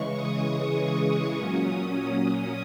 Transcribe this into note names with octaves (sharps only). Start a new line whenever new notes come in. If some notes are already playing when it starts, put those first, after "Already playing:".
Already playing: C#3 E3 G#3 C#6
D#6
A#2 F#3 C#4 D#6